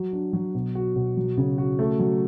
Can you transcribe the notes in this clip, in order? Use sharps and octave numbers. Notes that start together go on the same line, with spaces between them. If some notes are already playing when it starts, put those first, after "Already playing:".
Already playing: F#3
D4
F#3
B2
F#4
B2
F#3
C#3
F#4
A3
F#3